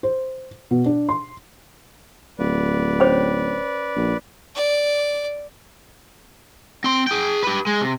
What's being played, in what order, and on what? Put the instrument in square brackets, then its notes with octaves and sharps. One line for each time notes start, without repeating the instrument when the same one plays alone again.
[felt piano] C5
B2
D4
C6
[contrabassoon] D1 [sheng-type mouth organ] B4 D5
[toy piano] C#4 C5 C#5
[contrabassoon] A#1
[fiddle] D5
[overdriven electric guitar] C4 C6
G#4 G5
G4 B4
G#3
C3